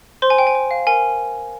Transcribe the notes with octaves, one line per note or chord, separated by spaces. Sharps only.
C5 C6
G#5
G5
G#5
C5
F5
A#4 G#5